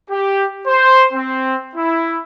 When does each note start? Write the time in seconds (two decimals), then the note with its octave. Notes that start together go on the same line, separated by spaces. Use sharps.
0.10 G4
0.67 C5
1.13 C4
1.75 E4